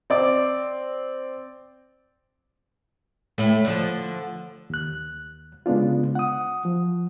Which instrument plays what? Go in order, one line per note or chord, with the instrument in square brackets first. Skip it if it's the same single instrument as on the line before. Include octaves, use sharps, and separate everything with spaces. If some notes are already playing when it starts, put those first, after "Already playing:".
[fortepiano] C4 D5 D6
[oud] A2 A3 E4
D3 F3
[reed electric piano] D#2 F#6
C#3 G#3 B3 D4 F4
F#5 D#6
F3